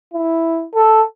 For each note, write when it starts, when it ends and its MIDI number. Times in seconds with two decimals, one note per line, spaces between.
0.13 0.66 64
0.75 1.02 69